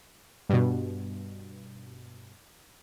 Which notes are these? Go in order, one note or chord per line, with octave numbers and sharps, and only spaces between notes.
G2 B2